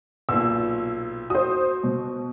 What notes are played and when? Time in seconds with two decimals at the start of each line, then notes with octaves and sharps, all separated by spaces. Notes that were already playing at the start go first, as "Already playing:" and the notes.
0.29 B1 A#2 E6
1.30 F#4 C5 D#6
1.84 B2